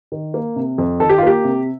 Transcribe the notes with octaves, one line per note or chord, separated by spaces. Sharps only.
D#3
A#3
C3
F2
D#3 A4
G4
F4
A#3 G4
C3